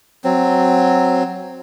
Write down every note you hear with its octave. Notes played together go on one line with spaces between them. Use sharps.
F#3 C4